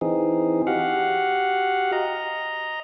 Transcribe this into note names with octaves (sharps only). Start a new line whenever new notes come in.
E3 C4 D#4 G#4
F#4 G4 F5 F#5
D#5 A#5